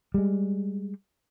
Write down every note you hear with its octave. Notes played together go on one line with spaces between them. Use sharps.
G3 G#3